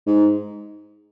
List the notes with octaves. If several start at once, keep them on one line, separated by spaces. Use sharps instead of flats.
G#2